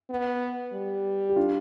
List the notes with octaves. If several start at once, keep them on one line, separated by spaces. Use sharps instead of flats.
B3
G3
G4
D4 F4